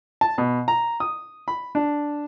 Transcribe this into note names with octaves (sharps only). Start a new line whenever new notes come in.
A5
B2
A#5
D#6
B5
D4